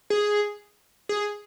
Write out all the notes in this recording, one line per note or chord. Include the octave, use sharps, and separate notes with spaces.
G#4
G#4